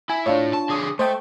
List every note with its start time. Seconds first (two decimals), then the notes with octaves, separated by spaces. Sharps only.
0.09 E4 G#5
0.26 A2 D4 F4 C#5
0.53 A5
0.70 D3 G#4
0.99 A3 C5 D#5 G5